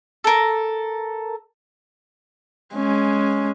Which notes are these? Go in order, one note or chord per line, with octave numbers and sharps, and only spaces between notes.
A4 A#4
G#3 C#4